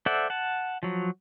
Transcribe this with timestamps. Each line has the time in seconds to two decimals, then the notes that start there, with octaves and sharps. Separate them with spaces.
0.06 A4 C5 D5 E5 F#5
0.30 F#5 A5
0.83 F3 F#3